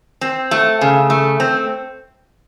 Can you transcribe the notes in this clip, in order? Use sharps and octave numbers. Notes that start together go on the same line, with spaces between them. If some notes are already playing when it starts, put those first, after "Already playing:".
C4
A3
C#3
A3
C4